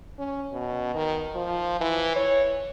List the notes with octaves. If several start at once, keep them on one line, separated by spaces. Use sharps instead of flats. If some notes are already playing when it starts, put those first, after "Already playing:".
C#4
B2
D#3
F3
E3
C#5